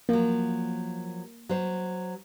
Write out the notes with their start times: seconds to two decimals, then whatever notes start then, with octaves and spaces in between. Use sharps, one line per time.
0.09 F3 F#3 A#3
1.49 F#3 C5